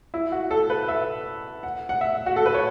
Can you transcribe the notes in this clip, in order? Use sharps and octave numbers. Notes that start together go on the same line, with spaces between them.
E4
F#4
A4
B4
E5
F#5
F#5
E5
F#4
A4
B4
C#5